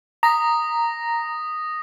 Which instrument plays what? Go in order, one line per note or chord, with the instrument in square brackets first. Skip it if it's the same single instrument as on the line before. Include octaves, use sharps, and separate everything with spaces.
[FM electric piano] A#5 [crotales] D#6 A#6 B6